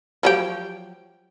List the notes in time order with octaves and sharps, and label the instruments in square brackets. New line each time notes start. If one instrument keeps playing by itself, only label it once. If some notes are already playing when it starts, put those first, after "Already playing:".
[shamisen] F3 F#3 G4